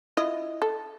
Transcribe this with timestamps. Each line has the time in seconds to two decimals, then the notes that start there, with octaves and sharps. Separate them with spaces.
0.17 E4 F4 D#5
0.62 A4